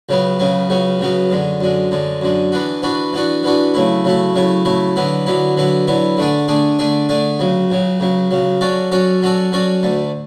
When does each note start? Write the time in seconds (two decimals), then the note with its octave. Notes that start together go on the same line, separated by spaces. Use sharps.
0.09 C#2 C#3 F#3 B3
0.39 C#2 C#3 F#3 B3
0.69 C#2 C#3 F#3 B3
1.00 C#2 C#3 F#3 B3
1.30 F#2 D3 G#3
1.61 F#2 D3 G#3
1.91 F#2 D3 G#3
2.21 F#2 D3 G#3
2.52 E3 B3 D4 F#4
2.82 E3 B3 D4 F#4
3.13 E3 B3 D4 F#4
3.43 E3 B3 D4 F#4
3.74 C#3 F#3 A3 E4
4.04 C#3 F#3 A3 E4
4.35 C#3 F#3 A3 E4
4.65 C#3 F#3 A3 E4
4.96 D3 F#3 B3 E4
5.26 D3 F#3 B3 E4
5.57 D3 F#3 B3 E4
5.87 D3 F#3 B3 E4
6.17 D3 A3 D4 G#4
6.48 D3 A3 D4 G#4
6.79 D3 A3 D4 G#4
7.09 D3 A3 D4 G#4
7.39 C#2 C#3 F#3
7.70 C#2 C#3 F#3
8.00 C#2 C#3 F#3
8.31 C#2 C#3 F#3
8.61 F#3 C#4 F#4 A4 D5
8.91 F#3 C#4 F#4 A4 D5
9.22 F#3 C#4 F#4 A4 D5
9.52 F#3 C#4 F#4 A4 D5
9.83 D2 D3 A3